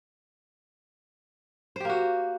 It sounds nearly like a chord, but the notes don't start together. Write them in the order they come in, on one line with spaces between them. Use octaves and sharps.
C5 G4 A#3 F#4